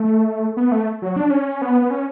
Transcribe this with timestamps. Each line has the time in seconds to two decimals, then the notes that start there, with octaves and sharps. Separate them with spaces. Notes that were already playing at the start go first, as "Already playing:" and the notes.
Already playing: A3
0.57 B3
0.72 A3
1.02 F#3
1.16 D4
1.31 C#4
1.62 B3
1.82 B3
1.90 C#4